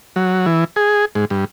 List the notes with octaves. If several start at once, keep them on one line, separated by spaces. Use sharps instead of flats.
F#3
E3
G#4
G#2
G2